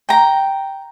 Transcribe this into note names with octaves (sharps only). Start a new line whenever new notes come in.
G5 A#5